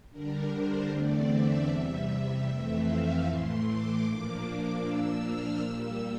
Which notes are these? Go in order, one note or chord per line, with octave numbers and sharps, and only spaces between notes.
D3 G3 D4 A#4
C5
E2 D3 A3 C4 D5
E5
E2 C3 G3
E5
F2 E3 A3 C4
F5
A2 E3 A3 C6
D6
A#2 F3 A#3 D4
A#2 F3 A#3 D4 E6
F6
A#2 G3 A#3 E6